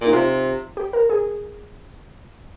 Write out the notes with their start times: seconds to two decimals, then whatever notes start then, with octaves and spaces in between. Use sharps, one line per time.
0.01 A#2
0.06 D#4
0.12 C3 F4
0.77 G4
0.93 A#4
1.10 G#4